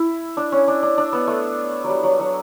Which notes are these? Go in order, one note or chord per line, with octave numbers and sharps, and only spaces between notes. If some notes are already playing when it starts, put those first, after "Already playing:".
Already playing: E4
D4
C#4
D4
D4
D4
B3
A3
F#3
G3
F#3
F#3